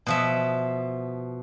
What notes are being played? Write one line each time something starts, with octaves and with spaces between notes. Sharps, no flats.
B2 F3 E5